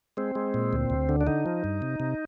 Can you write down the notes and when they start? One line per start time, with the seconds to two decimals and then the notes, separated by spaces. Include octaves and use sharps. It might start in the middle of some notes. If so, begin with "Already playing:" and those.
0.17 G#3 C4
0.35 G#3
0.54 A#2
0.73 D2
0.90 D2
1.09 D3
1.21 D4
1.27 D3 D#4
1.46 F3
1.64 G2
1.82 C3
2.00 C3